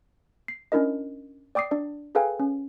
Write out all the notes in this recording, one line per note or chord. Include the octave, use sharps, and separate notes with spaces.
C7
C#4 D4 E4 A#4 D#5
D5 G5 D6 D#6 C7
D4 D5
G#4 A4 B4 F5 G5 G#5
C#4